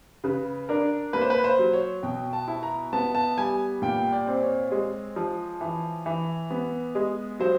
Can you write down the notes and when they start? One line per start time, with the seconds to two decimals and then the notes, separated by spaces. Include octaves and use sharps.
0.24 C#3 B4
0.69 D4 A#4
1.13 A#3 B4
1.21 C5
1.30 B4
1.44 C5
1.59 F#3
1.73 C#5
2.03 B2 G5
2.33 A5
2.48 E4
2.63 A#5
2.93 B3 A5
3.15 A5
3.38 G3 G#5
3.82 A#2 G5
4.12 D5
4.27 C4
4.42 C#5
4.71 G#3
5.16 F3
5.61 E3
6.06 E3
6.50 B3
6.95 G#3
7.40 F#3 C5